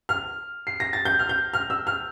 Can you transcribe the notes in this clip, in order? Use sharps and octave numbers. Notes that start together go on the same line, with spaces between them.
F6
C7
A#6
A6
G6
F6
G6
F6
E6
F6